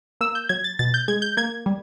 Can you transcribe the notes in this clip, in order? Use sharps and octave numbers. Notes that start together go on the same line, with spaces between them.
A#3 E6
G6
F#3 G#6
A6
B2 A6
G6
G#3 G#6
G6
A#3 G#6
G3